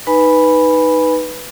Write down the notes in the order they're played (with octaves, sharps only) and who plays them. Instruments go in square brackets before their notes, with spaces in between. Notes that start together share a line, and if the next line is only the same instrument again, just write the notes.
[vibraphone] D#4 B4 G#5 B5